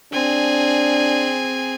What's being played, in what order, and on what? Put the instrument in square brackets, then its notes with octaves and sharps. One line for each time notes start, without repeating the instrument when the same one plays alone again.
[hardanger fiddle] C4 G#4 [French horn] D4 [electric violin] G#5